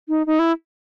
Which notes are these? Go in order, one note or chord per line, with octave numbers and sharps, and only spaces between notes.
D#4
D#4
E4